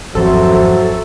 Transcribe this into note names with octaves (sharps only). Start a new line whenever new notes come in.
G#1 F2 F#3 A4 C5 E5